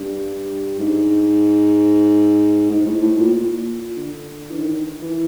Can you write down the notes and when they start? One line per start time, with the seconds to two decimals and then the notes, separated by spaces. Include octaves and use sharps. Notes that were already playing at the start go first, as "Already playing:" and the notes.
Already playing: G2
0.79 G#2
2.70 G#2
2.86 A2
3.02 A2
3.17 A#2
3.32 A#2
3.97 D3
4.51 E3
4.59 D#3
5.02 E3